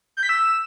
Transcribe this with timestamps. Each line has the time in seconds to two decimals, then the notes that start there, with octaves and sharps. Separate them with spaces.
0.17 G6
0.23 B6
0.29 E6